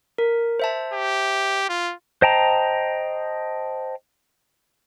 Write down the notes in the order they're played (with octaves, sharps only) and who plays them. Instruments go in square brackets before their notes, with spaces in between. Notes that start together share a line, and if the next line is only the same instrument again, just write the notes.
[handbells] A#4
C5 E5 A5
[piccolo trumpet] G4
F4
[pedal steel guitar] C5 D#5 G5 A5 A#5